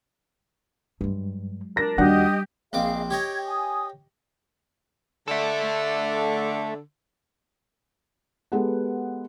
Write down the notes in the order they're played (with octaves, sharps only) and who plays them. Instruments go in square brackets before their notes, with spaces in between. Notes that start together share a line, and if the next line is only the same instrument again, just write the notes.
[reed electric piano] G2 [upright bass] F#3 G#3
[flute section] D4 [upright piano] A#4 A#6
[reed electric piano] D#2 F#4 F#5 [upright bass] G3 [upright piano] D4 [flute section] G4 D#5
[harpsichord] A#1 C4 D6 [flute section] G#4 D#5 F5
[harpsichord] G4 C#5 D#5 [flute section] G5 G#6
[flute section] G#5 D#6
[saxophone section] D3 [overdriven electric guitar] A4 E5
[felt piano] G#3 B3 G4 A4 B4 F#5